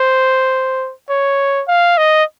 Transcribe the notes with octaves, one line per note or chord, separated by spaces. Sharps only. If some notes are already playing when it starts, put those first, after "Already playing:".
Already playing: C5
C#5
F5
D#5